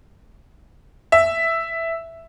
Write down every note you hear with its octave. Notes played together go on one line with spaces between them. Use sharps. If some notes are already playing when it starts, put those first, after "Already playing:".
E5